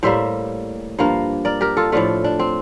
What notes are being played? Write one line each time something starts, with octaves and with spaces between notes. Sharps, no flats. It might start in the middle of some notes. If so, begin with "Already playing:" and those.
A2 G3 A#3 C5 E5
G2 F3 A#3
A#4 D5
G4 A#4
F4 A4
A2 F3 A3 D4 F4
D4
C4